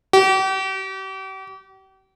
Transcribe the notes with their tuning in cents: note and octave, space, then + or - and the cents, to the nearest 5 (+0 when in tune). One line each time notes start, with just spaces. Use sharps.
G4 -40